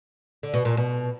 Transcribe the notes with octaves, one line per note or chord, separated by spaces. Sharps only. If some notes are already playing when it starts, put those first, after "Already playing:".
D3
B2
A#2
B2